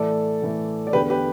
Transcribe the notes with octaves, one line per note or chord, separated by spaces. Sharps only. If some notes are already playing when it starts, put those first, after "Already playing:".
Already playing: A2 E3 A3 A4 D5
A2 E3 A3
D5
E2 D3 B3 G4 B4
G4 B4